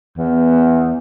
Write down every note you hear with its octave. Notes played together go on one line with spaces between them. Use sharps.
E2